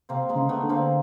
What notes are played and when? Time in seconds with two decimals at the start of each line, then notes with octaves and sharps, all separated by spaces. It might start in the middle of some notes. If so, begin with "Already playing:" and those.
0.09 C3 A#3 C4
0.29 G#3 A#3
0.35 C#3
0.49 A3 B3
0.62 D3
0.69 A#3 C4